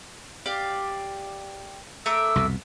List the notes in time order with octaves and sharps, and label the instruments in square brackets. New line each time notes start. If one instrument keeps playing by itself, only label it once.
[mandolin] G4 D5 F5
[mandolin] A3 A#4 D6 [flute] E6
[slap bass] C2 F2 B2